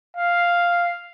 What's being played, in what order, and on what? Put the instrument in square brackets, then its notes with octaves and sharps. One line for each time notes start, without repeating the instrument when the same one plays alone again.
[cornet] F5